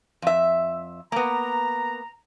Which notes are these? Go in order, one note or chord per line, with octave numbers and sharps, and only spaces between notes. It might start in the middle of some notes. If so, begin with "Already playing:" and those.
F2 E5
A#3 B3 A#5